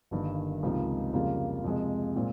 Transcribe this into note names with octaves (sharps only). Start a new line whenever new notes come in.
G1 G2 D#3 A#3
C#2 C3 F3 A#3 D#4
F2 C#3 G3 A#3 F4
F2 C3 F3 G#3
A#2 G#3 C4